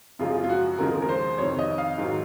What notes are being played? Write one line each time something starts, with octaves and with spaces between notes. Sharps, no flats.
F#2 C#3 F3 G#3 F4
F4
F4
F#4
D#2 C#3 F3 G#3 A#4
A#4
C5
F2 C3 D#3 C#5
D#5
F5
G#2 D#3 F#3